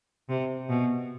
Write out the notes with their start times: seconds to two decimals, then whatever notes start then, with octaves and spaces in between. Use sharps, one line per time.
0.29 C3
0.69 B2